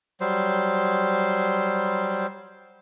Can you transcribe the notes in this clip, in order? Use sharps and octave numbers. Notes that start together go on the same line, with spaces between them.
F#3 G3 C5